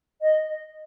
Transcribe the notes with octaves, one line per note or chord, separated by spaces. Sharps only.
D#5